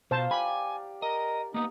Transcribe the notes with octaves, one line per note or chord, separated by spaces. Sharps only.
B2 C5 F5 A5 A#5
G4 D5 G#5 B5
A#4 D#5
A#3 B3 D#4